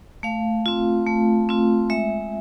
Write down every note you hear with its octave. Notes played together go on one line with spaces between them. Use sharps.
A3 F5
C4 F4
A3
C4 F4
G#3 E5